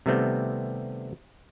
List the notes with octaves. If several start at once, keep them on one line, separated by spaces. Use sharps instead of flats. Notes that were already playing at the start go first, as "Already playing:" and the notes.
C3 D#3 G3 A3 B3 C4